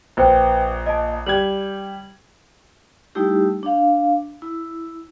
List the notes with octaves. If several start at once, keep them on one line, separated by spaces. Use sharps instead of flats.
A#1 B4 C5 G5
D#5 A5
G3 G4 G#6 F#7
G3 A3 D#4 E4 G4
D4 F5
E4